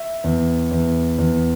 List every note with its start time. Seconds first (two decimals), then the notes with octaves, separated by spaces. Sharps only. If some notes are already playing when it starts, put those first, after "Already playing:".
Already playing: E5
0.24 E2
0.71 E2
1.18 E2